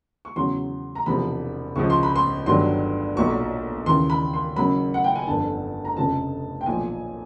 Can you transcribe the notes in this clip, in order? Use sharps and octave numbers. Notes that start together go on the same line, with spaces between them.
C#6
E2 C#3 F#3 C6
A#5
E1 E2 C3 F3 B5
C#2 C#3 F3 C#6
C6
B5
C6
G1 G2 D#3 F#3 C6
B1 A#2 F#3 C#6
D#2 C#3 E3 C6
B5
C6
F#1 F#2 C#3 F#3 B5
F#5
G5
G#5
G1 F2 D3 A5
A#5
F1 F2 C#3 F3 A5
G5
B1 A#2 F3 G#5